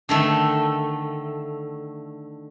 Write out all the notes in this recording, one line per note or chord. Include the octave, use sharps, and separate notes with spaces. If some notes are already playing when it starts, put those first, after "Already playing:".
D3 D#3 A3